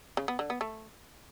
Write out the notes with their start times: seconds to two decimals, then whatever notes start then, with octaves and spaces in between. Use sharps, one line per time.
0.17 C#3
0.28 B3
0.39 D3
0.50 B3
0.61 A3